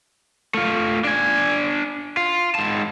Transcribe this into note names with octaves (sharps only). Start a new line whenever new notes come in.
A3 F4
D4 G#5
F4
G#2 A5